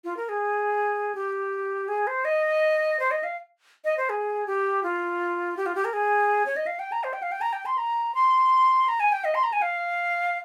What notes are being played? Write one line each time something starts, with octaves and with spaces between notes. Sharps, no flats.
F4
A#4
G#4
G4
G#4
C5
D#5
C5
D#5
F5
D#5
C5
G#4
G4
F4
G4
F4
G4
A#4
G#4
C#5
D#5
F5
G5
A#5
C5
G5
F5
G5
A#5
G5
C6
A#5
C6
A#5
G#5
G5
D#5
C6
A#5
G#5
F5